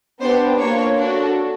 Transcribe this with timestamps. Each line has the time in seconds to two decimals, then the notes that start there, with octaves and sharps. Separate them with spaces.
0.20 B3 D4 G4 C5
0.58 A#3 D4 F4 C#5
0.95 D4 F#4 A4